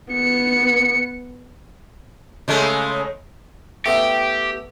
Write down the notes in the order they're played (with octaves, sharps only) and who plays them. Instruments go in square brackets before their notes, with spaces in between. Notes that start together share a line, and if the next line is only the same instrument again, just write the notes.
[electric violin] B3 C#7
[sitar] C#3 G#3 A3
[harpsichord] A3 B3 E4 [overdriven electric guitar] G4